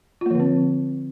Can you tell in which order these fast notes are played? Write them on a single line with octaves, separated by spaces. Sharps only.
F4 A#3 F3 D3 C4